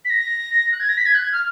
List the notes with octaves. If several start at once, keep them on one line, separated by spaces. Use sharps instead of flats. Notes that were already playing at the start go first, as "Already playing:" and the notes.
B6
A#6
F#6
G#6
A#6
B6
G#6
F#6
G#6
F6